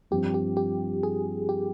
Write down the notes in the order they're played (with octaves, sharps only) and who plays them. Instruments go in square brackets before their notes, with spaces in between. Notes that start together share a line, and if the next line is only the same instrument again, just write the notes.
[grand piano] G2 F3 C4 F4 [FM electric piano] G4
[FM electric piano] G4
G4
G#4
G4